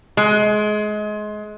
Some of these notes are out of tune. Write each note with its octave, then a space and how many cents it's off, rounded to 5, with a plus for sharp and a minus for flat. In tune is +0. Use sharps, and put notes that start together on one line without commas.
G#3 +25